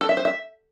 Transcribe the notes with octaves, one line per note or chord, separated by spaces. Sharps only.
A4
E5
C5
E5